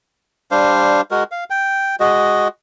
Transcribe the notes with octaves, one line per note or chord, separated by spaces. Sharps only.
G3 D4 C5 F5
G#3 F#4 A#4
F5
G5
G#3 F#4 D#5